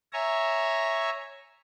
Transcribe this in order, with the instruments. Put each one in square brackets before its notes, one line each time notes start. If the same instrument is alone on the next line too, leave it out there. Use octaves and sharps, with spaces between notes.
[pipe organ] C#5 E5 G#5 A#5